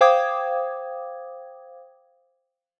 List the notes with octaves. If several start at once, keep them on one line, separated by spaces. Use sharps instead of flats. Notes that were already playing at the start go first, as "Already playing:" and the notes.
C5 F5 G5 D6 D#6 G#6